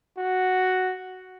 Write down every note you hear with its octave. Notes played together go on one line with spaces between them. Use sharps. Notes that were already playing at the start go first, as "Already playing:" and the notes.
F#4